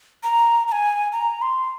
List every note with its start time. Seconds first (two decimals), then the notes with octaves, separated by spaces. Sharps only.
0.23 A#5
0.68 A#5
0.72 G#5
1.12 A#5
1.42 C6